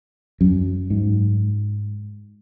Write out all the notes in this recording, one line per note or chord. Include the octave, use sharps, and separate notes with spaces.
F#2
G#2